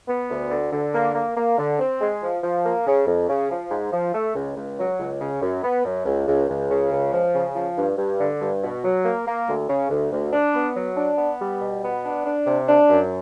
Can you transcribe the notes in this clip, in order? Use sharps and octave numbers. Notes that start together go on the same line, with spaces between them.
B3
D2
D3
D3
A#3
A#3
A#3
D3
C4
G#3
F3
F3
A#3
C#3
F2
C#3
F3
G#2
F3
A3
C#2
C#2
F#3
C#2
C#3
F#2
B3
F#2
C#2
C#2
C#2
C#3
C#2
F3
C#3
F3
G2
G2
D3
G2
B2
F#3
A#3
A#3
D2
C#3
D2
D2
D4
B3
F#3
D4
B3
G3
B2
B3
D4
D4
C3
D4
F#2